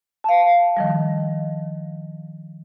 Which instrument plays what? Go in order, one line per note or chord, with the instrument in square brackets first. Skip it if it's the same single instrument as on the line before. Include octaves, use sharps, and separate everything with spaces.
[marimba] F5 A5
D#3 F3 G3